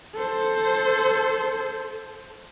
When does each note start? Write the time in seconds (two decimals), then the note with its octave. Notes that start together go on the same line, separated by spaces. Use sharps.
0.15 A4 C5